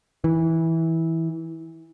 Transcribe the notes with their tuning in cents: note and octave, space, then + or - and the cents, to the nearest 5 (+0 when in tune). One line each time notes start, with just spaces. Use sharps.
E3 -15